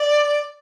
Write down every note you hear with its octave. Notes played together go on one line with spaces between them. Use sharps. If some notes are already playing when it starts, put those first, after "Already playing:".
Already playing: D5